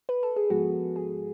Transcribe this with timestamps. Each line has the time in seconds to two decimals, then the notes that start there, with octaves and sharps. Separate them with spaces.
0.09 B4
0.23 A4
0.36 G#4
0.50 G#2 F3 G#3 B3 F#4
0.96 G#4